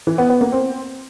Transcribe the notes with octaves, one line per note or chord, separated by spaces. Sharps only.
E3
B3
B3
A#3
C4